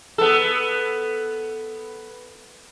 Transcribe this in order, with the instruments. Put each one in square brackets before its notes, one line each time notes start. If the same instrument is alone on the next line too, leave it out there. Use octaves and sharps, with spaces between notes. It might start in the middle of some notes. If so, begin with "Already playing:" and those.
[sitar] B3 A4